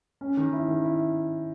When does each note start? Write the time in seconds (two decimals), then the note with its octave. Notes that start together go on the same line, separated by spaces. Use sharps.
0.21 C#4
0.37 D#3
0.53 E4
0.68 D#3
0.84 E4